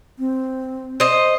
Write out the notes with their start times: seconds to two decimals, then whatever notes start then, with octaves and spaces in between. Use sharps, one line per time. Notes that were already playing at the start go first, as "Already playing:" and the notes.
0.19 C4
1.00 C5 D#5